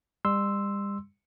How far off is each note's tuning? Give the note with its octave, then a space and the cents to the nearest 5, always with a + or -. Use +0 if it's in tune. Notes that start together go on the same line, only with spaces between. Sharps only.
G3 +35 C6 +0 E6 +0